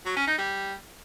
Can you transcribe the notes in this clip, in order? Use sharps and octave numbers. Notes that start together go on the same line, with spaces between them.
F#3
C#4
D#4
G3